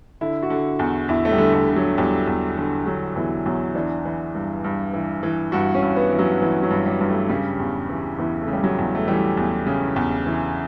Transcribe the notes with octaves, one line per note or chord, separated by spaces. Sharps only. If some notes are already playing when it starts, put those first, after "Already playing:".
D3 E4
F#4
D3
E2
E2 E4
A3
G3
D3
A3
D3
F#3
E2 G3
E2
D3
D3 F#3
E2 E3
E2 F#3
E3 D4
E3
G2
G2
E3
E3
G2 F#4
C#4
G2
B3
E3
F#3
E3
F#3
G2
G3
G2
A3
C#3 G3
E2
E3
E2 E3
A3
C#3
G3
F#3
E2
A3
E3 G3
E2
C#3
E2
E3